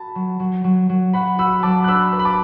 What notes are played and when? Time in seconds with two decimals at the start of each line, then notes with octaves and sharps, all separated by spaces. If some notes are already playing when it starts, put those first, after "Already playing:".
Already playing: F#4 A5 B5
0.15 F#3
0.40 F#3
0.64 F#3
0.89 F#3
1.13 F#4 F#5 B5
1.39 F#4 B5 E6
1.63 F#3 A5 D6
1.84 F#6
1.88 D4 B5 E6
2.12 B4
2.19 B5
2.25 A5 D6